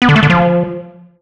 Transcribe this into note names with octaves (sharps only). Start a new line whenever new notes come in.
B3
D3
A3
D3
F3